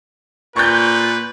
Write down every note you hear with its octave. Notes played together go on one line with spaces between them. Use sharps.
A#2 B4 C#6 G6